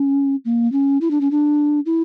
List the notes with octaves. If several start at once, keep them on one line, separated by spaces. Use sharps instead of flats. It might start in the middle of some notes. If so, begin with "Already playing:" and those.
Already playing: C#4
A#3
C#4
E4
D4
C#4
D4
E4